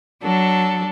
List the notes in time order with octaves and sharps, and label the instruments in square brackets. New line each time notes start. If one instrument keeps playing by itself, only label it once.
[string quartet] F#3 D4 A4